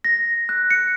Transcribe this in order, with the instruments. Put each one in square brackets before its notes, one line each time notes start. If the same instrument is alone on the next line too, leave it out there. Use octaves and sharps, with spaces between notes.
[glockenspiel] A#6
F#6
C#7